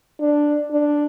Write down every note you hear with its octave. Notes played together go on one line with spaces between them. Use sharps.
D4
D4